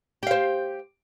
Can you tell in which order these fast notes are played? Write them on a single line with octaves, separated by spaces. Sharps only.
G4 F5 C5